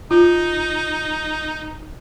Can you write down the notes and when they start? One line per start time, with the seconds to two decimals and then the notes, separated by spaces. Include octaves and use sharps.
0.11 D#4 F4